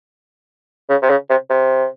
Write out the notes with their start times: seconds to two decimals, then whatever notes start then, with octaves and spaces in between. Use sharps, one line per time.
0.90 C#3
1.02 C3
1.10 C#3
1.30 C3
1.50 C3